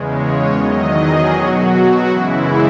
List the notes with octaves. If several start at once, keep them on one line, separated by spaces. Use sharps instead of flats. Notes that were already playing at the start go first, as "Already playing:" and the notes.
Already playing: E2 C#3 G#3
C#5
E2 D#3 F#3 D#5
G#4
B2 F#3 F#4
F#2 C#3 E3 G#3 E4